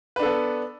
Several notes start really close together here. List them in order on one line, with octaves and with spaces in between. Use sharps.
B4 D4 A4 B3